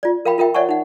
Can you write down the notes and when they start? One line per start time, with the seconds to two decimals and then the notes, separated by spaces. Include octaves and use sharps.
0.03 F4 D5
0.25 A#4 F5 G5 B5
0.38 F4 A#4 E5 G5
0.54 C#5 D5 E5 F#5 G#5 C#6
0.69 D#4 F#5